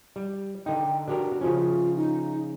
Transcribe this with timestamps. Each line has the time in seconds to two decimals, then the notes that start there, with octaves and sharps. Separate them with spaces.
0.16 G3
0.66 D3 D#4 G5
1.08 D4 F#4 G4 A#4
1.41 C#3 F3 C#4 F4
1.96 D#4